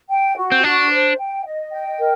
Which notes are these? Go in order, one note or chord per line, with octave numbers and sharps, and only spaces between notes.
G5
F#4
C4
D4 F#4
C5
G5
D#5
G5
A#4